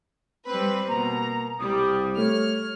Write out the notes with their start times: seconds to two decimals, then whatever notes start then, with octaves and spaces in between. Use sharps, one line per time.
0.47 G3 C4 B4
0.89 B2 A#3 A#5
1.59 C2 G3 D#6
2.18 A3 C#5 F6